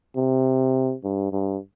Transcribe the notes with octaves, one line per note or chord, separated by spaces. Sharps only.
C3
G2
G2